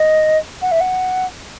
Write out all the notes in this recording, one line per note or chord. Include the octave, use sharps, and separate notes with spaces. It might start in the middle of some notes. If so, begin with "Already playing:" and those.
Already playing: D#5
F#5
E5
F#5